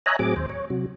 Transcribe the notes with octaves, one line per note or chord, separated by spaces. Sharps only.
C#5 D#5 E5 G#5 A#5 F#6
A2 F#3 C4 G#4 D6
D#2 C5
C#5
C3 F#3